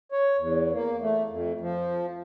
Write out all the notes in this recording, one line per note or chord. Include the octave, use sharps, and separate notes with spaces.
C#5
E2
A#3
A3
F2
F3